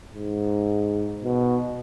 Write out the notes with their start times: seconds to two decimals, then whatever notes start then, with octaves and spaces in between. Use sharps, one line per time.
0.13 G#2
1.23 B2